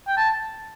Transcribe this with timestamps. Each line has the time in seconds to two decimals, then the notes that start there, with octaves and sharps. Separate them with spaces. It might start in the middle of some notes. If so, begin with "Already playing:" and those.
0.08 G5
0.17 A5